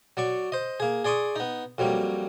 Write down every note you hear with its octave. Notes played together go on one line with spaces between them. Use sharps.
F#3 D5 C#6
C5 D#5
A#3 G#4
G#4 D5 C6 C#6 D#6
B3 D#4
F2 F#3 G3 A#3